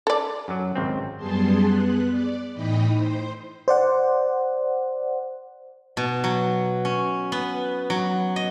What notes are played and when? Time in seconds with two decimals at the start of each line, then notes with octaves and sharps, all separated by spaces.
0.07 A4 D5
0.48 F#2 F#3
0.76 G#1 C#2 C4
1.17 F#2 G3 B3 G#4 A5 C6
1.61 B3 F#6
2.10 D5
2.53 A2 E3 D#4 D#5 G5 B5
2.95 C5 C6
3.68 C5 D5 F#5
5.97 B2
6.24 F#3
6.85 C#4
7.32 B3
7.90 F#3
8.36 D#5